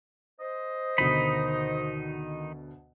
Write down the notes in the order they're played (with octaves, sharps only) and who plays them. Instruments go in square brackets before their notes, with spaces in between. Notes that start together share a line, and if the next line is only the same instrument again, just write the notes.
[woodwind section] C5 D#5
[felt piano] D2 B2 D3 [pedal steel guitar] D#3 D#4 B5